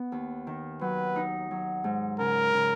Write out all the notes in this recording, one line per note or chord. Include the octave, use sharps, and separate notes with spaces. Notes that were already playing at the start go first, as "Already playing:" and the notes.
Already playing: B3
D#2
D#3
F#3 B4
D#4
F#3
G#2
C#3 A#4
C#3